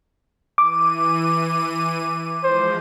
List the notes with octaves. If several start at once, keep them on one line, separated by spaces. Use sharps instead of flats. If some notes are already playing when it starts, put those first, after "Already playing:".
E3 D6 D#7
F3 G#3 C5